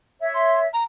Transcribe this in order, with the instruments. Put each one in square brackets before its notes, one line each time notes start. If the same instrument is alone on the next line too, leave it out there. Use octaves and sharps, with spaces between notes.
[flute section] C#5 E5
[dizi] C6
A#5